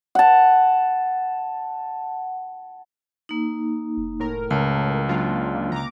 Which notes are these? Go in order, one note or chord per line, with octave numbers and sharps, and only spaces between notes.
F#5 A5
A#3 D#4
F1
A2 A#4
C#2 C#3 C#5 A5
F#3 A#3 D4 F4
C#3 A#5 D6